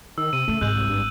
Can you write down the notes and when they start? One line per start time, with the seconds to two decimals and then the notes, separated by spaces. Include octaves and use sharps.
0.18 D#3 E6
0.33 C3 D#7
0.48 C#3 A3
0.61 G#1 G#3 F#6 G6 F#7
0.75 C2
0.89 G2